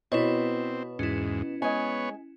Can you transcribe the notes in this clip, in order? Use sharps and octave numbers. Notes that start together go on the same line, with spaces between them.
B2 C4 E4 C#5
E2 G#2 C#4 E4
G#3 B3 C#5 G#5